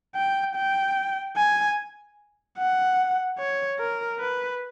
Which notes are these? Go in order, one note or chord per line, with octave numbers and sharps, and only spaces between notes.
G5
G5
G#5
F#5
C#5
A#4
B4